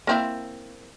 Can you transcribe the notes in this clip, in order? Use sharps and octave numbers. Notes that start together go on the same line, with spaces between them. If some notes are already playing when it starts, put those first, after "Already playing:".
A#3 C4 E4